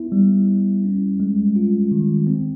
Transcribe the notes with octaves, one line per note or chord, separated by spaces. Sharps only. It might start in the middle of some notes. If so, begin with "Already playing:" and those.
Already playing: B3 E4
G3
G3
C#4
G#3
F4
D#3
C4